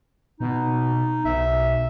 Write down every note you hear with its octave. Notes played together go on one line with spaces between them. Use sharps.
B2 D#4
B1 E5